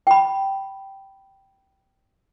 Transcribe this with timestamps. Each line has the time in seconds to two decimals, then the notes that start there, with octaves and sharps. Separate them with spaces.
0.07 G5 B5